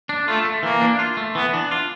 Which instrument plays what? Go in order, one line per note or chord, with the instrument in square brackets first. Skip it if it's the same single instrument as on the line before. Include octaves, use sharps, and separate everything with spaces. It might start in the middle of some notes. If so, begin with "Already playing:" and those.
[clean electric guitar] D4
[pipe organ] A3 [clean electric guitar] F4
[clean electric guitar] A3
[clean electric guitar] E3 [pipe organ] A#3
[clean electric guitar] D4
F4
A3
[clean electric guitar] E3 [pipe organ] B3
[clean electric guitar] D4
F4